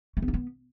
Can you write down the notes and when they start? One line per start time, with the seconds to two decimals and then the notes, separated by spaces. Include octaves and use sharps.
0.17 A3
0.22 B3
0.28 D#4
0.34 B3